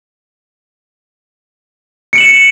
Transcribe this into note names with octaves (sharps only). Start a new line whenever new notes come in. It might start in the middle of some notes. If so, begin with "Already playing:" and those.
C#7 D7 E7 F#7